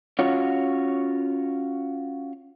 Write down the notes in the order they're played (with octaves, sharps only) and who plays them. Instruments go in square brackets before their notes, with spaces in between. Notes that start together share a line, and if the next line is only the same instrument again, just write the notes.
[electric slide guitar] C#4 F4 F#4 C#5